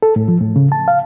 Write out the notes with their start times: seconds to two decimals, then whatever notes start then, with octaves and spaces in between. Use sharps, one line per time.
0.03 A4
0.16 A2
0.28 F3
0.40 A2
0.56 C#3
0.72 A5
0.88 F5